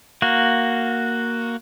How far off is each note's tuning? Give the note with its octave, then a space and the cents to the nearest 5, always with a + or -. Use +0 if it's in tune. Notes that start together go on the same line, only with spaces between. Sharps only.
A#3 +0 F#4 +0